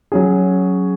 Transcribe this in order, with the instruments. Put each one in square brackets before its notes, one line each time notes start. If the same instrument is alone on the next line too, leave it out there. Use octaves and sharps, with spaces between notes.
[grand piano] F#3 C#4 G#4